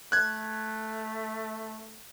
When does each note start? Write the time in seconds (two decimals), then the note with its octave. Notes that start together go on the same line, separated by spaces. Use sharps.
0.12 A3 F#6 G#6